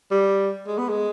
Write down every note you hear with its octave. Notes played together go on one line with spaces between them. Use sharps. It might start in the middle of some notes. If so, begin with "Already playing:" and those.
G3
G#3
B3
G#3